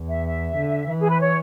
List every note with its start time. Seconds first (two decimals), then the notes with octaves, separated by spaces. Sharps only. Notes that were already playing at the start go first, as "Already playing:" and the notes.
Already playing: E2
0.09 E5
0.25 E5
0.57 D3
0.88 E3
0.99 G#4
1.10 B4
1.20 C#5